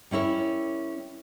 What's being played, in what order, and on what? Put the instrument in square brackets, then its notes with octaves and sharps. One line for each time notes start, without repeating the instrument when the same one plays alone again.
[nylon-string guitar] G3 C#4 E4 A#4 C#5